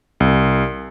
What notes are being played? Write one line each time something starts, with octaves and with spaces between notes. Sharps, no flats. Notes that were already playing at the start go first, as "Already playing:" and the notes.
C2